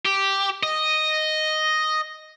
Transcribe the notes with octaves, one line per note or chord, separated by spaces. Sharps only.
G4
D#5